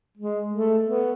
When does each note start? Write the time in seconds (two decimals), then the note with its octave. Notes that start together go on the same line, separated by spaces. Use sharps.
0.17 G#3
0.53 A3
0.88 B3